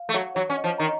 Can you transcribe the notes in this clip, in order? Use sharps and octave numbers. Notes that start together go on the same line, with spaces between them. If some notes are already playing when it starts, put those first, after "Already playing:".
Already playing: F5
A3
F#3
F#3 C#5
C#4
D#5
F3
D#3 A#5